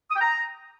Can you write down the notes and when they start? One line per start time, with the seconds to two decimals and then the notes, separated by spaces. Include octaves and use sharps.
0.11 D#6
0.16 G5
0.21 A#5